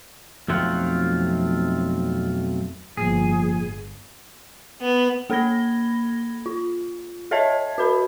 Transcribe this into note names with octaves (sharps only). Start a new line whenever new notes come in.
B1 F2 A3 C4 F4 F#5
G1 A2 F3 A#3 G#4
B3
A#3 A4 B5 G#6 A#6 G7
F4
A4 C#5 D#5 E5 A5 G#6
F#4 B4 B5